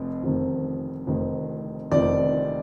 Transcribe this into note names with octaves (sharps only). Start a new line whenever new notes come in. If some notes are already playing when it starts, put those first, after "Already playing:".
Already playing: F1 F2
F1 F2 D#3
F1 F2 D#3
F1 F2 D#3 D5